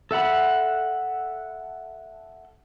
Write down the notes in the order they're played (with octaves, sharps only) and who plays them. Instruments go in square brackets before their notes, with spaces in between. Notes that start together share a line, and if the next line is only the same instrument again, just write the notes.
[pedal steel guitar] A4 E5 F#5 B5